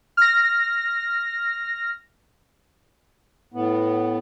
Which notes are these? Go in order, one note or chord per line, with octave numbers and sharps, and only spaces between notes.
F6 A#6
A2 B3